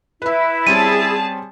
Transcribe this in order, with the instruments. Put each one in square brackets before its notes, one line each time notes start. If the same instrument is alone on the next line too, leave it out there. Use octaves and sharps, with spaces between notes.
[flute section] E4 [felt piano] B4 E5
[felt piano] G3 C4 C#4 [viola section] G#4 A5 [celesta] D#7